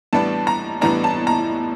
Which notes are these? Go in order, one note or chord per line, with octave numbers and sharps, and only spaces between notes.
A2 E3 G3 B3 D4 A5
A#5
A2 E3 G3 B3 D4 A#5
A5
A#5